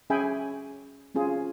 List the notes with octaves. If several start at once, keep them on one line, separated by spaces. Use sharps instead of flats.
C#4 G#4 E5 G5 G#5 B5
C4 C#4 F4 G#4